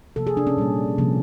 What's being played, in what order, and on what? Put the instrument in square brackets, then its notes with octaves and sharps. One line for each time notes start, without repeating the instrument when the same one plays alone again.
[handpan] C3 F3 A#3 A4
G#4
D4
C#4
A#2 G3 A#3
C3 F3 A#3